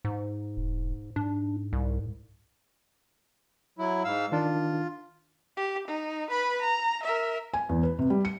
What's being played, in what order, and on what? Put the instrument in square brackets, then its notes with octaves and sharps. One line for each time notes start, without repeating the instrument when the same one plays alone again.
[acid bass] G#2
[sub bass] E1
[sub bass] G#2 [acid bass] D4
[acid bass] C2
[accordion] F#3 E4
G#2 F5 E6
[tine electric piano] D#3 D4 [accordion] F4
[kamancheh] G4
D#4
B4 B5
A#5
A#4 E5
[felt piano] G#5
E2
B4
C3
G3
C#7